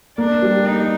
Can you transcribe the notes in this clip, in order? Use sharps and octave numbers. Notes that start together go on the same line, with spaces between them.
A#3 D4
G3
A#3 D#4